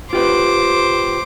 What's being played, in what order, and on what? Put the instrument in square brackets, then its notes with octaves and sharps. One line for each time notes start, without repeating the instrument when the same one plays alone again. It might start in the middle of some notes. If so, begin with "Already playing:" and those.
[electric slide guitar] F4 G4 B4 [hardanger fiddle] C5 D6